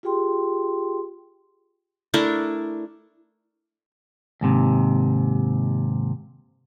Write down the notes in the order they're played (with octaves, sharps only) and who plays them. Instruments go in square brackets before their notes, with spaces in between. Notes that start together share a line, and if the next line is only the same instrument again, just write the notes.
[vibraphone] F4 G4 G#4 G5 C6
[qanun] A3 D4 E4 A#4
[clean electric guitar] D#2 G#2 C3